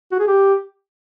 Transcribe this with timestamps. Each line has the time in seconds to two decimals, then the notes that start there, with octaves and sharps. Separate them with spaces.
0.12 F#4
0.20 G#4
0.27 G4